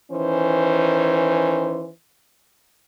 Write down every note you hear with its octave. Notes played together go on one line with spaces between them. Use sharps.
D#3 E3 C#4 C5